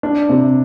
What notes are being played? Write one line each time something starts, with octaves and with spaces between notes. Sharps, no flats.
D4
C3